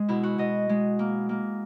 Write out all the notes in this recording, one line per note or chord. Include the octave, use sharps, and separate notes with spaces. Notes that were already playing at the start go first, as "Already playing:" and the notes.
Already playing: G#3
B2 E4
F#4
B2 D#5
G#3
A#3
A#3